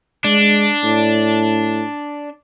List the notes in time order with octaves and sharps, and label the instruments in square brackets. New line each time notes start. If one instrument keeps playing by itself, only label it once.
[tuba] G#3 [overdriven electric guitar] D4
[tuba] A2